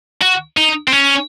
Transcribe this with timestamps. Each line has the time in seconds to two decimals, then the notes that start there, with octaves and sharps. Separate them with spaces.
0.22 F#4
0.57 D#4
0.87 C4
0.92 C#4